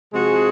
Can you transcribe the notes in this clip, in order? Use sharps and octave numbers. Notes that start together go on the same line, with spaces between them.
C3 F3 G#3 F#4 G#4